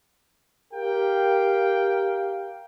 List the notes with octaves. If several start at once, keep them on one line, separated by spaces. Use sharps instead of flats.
G4 A#4 F5 G5